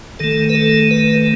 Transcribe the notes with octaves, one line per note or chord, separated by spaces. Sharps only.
D#3 A3 A4
B4
A4
B4